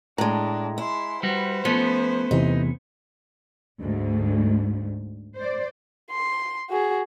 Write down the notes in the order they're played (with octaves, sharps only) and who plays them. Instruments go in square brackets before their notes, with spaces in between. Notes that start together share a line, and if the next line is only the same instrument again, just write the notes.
[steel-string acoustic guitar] A2 G#3 [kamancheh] D4 [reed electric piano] A#5
[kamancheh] G#3 C6 [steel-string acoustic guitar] E4
[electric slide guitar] G3 F#4 [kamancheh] B4 C5
[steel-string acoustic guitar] F3 [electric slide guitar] A3 B3 C#4
[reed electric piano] E2 C3 E3 [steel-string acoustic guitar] D#4
[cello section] D2 G#2
C5 D5
[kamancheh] C6
F#4 G#4